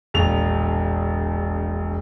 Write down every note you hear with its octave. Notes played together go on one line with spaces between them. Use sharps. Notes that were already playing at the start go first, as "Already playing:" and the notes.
E1 A#1 F7